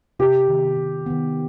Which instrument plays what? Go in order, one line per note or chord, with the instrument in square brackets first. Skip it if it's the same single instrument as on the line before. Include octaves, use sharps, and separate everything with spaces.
[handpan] C3 [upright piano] G4
[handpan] D#3 B3
C3
D#3 B3